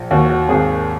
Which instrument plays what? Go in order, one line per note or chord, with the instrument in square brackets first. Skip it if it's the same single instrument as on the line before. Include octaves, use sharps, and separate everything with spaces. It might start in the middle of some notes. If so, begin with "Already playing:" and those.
Already playing: [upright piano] A#1
D#2 F#4
F#4
G#1 G#4